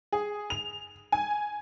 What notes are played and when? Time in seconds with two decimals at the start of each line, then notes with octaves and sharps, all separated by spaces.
0.12 G#4
0.50 F7
1.12 G#5